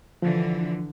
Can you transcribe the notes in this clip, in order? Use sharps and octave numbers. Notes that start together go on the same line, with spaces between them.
D3 E3 F3